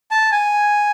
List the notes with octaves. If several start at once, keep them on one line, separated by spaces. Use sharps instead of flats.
A5
G#5